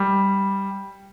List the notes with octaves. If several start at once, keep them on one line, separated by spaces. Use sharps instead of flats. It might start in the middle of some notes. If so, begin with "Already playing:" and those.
Already playing: G3